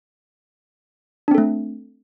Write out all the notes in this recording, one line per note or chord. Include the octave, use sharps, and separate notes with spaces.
A3 C4 D4 A4